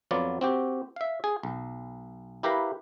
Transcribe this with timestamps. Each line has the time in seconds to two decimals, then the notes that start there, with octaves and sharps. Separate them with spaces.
0.11 F2 F#3 B3 F4 D5
0.41 C4 F#4 G4
0.96 E5 F5
1.24 G#4
1.43 B1
2.43 E4 G4 A#4 B4 F5 A#5